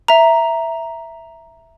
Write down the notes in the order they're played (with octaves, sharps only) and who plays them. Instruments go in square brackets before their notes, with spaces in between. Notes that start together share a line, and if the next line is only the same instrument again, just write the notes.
[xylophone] E5 A#5